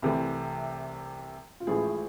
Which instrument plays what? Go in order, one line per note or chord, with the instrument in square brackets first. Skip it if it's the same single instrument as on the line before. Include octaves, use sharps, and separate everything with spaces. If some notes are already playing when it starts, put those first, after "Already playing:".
[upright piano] C2 C3 E3 A3
F4
A1 A2 F3 G#3 E4 G#4